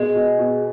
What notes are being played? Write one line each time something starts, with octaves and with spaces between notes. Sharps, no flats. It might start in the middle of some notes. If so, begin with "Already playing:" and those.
Already playing: B2 G#3
B2
B2